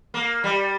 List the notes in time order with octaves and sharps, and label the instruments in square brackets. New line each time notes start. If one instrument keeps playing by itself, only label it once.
[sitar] A#3
G3